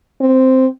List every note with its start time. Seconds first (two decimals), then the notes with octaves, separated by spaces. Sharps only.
0.21 C4